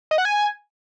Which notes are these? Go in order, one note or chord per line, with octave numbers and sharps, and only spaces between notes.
D#5
F#5
G#5